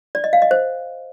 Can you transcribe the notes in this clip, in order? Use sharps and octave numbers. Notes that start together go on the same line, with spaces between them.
D5
D#5
F5
D#5
C5